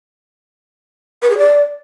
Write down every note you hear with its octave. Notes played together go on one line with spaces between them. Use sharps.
B4
G#4
D5